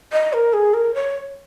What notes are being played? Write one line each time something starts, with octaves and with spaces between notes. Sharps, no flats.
D#5
A#4
G#4
A#4
C#5